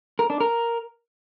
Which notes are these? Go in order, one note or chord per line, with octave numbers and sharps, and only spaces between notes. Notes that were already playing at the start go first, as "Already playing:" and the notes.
A#4
D4
A#4